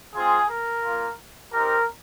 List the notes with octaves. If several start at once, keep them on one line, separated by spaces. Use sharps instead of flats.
G#3 C4 F4 G#4
A#4
A#3 F4
C4 D#4 G4 A#4